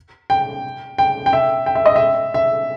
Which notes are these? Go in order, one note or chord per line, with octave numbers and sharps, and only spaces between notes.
G5
G5
G5
E5
G5
E5
D#5
E5
E5